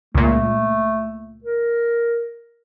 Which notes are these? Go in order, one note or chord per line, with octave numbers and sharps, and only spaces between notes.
C#2 A#2 A3
A#4